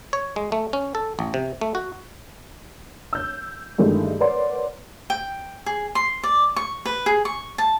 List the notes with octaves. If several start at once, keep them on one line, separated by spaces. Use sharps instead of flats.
C#5
G#3
A3
C#4
A4
A1
C3
A3
F#4
E6 G6
G2 D#3 E3 G#3 A3
A#4 B4 C#5 D5 F#5 C6
G5
G#4
C6
D5
C#6
B4
G#4
C#6
A5